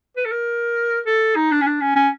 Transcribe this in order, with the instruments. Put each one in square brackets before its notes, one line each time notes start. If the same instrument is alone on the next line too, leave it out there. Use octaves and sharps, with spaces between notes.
[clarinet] B4
A4
A#4
A4
D#4
D4
C#4
D4
C#4
C#4